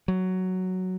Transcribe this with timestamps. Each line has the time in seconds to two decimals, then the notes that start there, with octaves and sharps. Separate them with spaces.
0.08 F#3